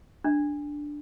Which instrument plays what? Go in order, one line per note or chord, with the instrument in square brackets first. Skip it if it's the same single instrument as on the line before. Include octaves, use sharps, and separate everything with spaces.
[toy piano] D4